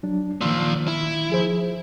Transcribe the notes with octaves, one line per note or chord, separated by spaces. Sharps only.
F#3 D4
A#2 D#3 F3 A#3 E6
E4
F3 G#4 C5